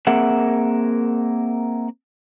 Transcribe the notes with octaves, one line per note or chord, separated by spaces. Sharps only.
A#3 C4 G#4 A#4 E5 F#5